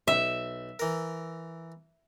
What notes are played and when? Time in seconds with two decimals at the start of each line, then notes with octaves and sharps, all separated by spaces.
0.08 B1 E5
0.79 E3 A#4